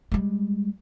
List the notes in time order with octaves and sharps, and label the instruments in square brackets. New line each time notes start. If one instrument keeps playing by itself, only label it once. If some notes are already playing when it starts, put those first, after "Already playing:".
[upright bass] G3 G#3